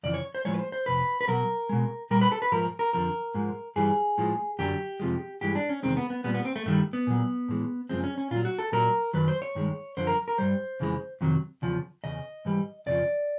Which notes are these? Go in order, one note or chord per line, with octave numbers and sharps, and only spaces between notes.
F2 C#3 E3 D5
C#5
C5
A2 F3 G#3 C#5
B4
C5
C5
F2 C3 B4
B4
B2 F#3 A#4
B2 G#3
A#2 G3 A#4
B4
A4
B4
G#2 F3 A#4
A#4
F2 D3 F3 A#4
G#2 F3 G#3
G2 E3 G3 G#4
A2 F3 G#3
F#2 D3 F#3 G4
F2 C3 F3 G#3
G2 E3 G#3 G4
D4
C#4
E2 C3 D#3 G#3 C4
B3
B3
A#2 G3 B3
B3
C4
A3
G2 D#3 G3 A3
B3
A#2 F#3
A2 E3 G#3
F#2 C#3 F3 G#3 C4
C#4
C#4
A#2 F#3 F4
F#4
A4
A#2 F#3 A#4
F#2 D#3 F#3 B4
C5
C#5
G2 D#3 G#3
F#2 D3 F3 C5
A#4
A#4
G2 D#3 G3 C5
F2 C#3 E3 G#3
F2 C3 D#3 F#3
E2 C#3 F3
E2 C#3 D#5
G#2 E3 G3
F2 C#3 F3 D5